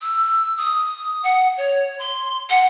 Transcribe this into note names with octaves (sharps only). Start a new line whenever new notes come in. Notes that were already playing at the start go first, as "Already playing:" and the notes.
E6
D#6
F#5
C#5
C6
F#5